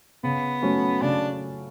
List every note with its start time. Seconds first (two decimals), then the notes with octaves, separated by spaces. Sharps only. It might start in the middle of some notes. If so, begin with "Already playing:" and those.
0.23 C#3 B3
0.62 F#3 A3 C#4
1.02 C#3 D4